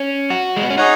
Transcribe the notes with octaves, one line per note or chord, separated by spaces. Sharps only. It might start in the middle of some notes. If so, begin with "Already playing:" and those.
Already playing: C#4
F#4
G#3
B3
C#4
D#4 G#4 C#5 F#5